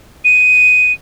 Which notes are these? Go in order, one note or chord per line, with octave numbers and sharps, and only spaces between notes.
D#7